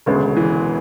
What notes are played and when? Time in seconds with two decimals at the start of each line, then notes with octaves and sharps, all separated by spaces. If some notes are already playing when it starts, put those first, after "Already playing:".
0.06 E1 D2 C#3 G#3 B3
0.37 E3